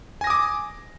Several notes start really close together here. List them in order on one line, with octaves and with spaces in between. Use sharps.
G#5 A#6 D#6 D6